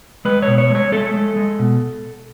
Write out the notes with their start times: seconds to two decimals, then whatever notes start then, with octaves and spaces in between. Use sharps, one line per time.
0.25 G#3 B4
0.42 C#5
0.47 B2
0.58 C#5
0.70 G#3
0.75 C#5
0.92 G#3 A4
1.14 G#3
1.36 G#3
1.59 B2